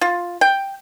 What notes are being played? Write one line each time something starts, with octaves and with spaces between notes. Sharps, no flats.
F4
G5